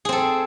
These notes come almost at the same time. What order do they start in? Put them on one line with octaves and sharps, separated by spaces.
G#4 C4 A4